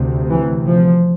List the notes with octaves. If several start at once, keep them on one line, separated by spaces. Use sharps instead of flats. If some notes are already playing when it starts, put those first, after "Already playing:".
Already playing: D2 C3
E3
F3